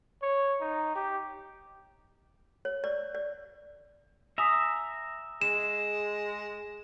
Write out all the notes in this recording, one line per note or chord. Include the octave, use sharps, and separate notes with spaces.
C#5
D#4
G4
C#5
D5
D5
E5 G#5 A#5 D#6 B6
G#3 E7